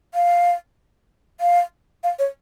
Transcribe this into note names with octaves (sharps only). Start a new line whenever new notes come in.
F5
F5
F5
C#5